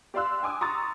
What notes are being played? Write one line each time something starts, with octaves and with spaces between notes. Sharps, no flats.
G4 D5 F5 C6 E6 F#6
G5 G#5 D6 D#6
A#5 C6 C#6 D#6 E6 A6